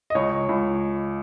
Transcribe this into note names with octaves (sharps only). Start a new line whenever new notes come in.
D#5
C#2 C#5
C#2